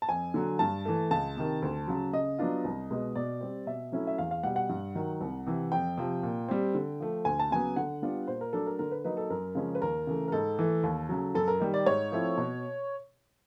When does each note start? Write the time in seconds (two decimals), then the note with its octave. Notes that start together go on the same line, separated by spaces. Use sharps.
0.02 A5
0.09 F2 G#5
0.34 D3 F#3
0.59 G2 A5
0.85 E3 A3
1.11 C#2 A5
1.37 C3 D#3
1.62 D2
1.88 C#3 F#3
2.13 C#3 D#5
2.39 F#3 B3 D4 F4
2.64 C2
2.91 B2 G#3 B3
3.15 B2 D5
3.41 G3 C4
3.67 B2 E5
3.92 F#3 A3 C#4 E4
4.07 E5
4.18 E2 F5
4.31 F5
4.43 B2 G3 F#5
4.56 F#5
4.69 G2
4.95 D#3 F#3
5.21 C2
5.47 C3 E3
5.72 F2 G5
5.98 C3 F3
6.23 A#2
6.49 G3 C4
6.74 D3
7.00 F3 A3
7.25 D2 G#5
7.39 A5
7.51 C#3 F#3 B3 G#5
7.76 D3 F#5
8.02 G3 B3 D4 F4
8.28 A#2 C5
8.41 A#4
8.53 F#3 A3 D4 A4
8.67 A#4
8.79 D3 A#4
8.91 B4
9.04 F#3 A#3 D#4 B4
9.17 A4
9.30 F#2 A#4
9.55 C#3 F3 G#3 C#4
9.75 B4
9.82 D#2 A#4
10.07 C#3 E3 A3
10.28 A#4
10.32 G#2 A4
10.59 E3 A3
10.83 D#2
11.09 C#3 F#3
11.34 F#2 A4
11.48 A#4
11.60 D#3 G3
11.74 D5
11.86 G#2 C#5
12.12 F3 A3 C4 E4
12.37 B2